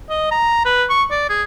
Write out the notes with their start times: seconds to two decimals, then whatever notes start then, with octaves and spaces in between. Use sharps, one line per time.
0.10 D#5
0.31 A#5
0.65 B4
0.90 C#6
1.11 D5
1.29 G#4